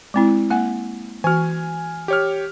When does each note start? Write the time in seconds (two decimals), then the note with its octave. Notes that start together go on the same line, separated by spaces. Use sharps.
0.14 G#3 C4 E4
0.50 A#3 F#5 G#5
1.24 E3 F#4 G#5 F6
2.08 G4 C#5 F6